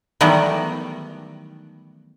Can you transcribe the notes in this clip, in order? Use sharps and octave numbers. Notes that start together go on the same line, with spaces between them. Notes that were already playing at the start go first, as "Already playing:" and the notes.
D#3 E3 F#3 G3 A3 B3